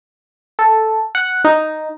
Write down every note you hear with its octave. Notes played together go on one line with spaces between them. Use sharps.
A4
F#5
D#4